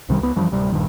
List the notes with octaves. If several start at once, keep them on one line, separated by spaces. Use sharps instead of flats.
C2 C3 D#3 G3
C#2 B3
F#2 E3 F3 G3
D1 C3 G3
A#1 G2 A#2 D#3